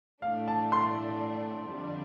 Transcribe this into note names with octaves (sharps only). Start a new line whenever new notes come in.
A2 A3 D4 F5
A5
C6
F2 D3 G3 D4